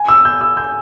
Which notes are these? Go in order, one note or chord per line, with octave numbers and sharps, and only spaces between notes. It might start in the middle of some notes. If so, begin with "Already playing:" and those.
Already playing: G#5
E6
G6
E6
G6